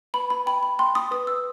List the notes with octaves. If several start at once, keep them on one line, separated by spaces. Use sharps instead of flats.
B4 B5
B5
G5 B5
B5
G5 C6
D#6
B4 D#6
E6